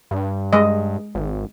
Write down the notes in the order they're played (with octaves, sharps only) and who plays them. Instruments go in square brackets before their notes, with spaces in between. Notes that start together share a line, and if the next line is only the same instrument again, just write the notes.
[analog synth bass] G2
[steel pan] G#3 D#5
[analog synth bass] G#1